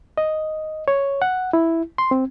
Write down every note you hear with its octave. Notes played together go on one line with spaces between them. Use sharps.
D#5
C#5
F#5
E4
C6
C4